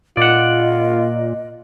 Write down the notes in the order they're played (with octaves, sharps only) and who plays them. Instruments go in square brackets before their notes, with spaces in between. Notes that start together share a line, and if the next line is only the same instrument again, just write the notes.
[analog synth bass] A#2 [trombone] F4 [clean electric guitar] D5 F#5 [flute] D#5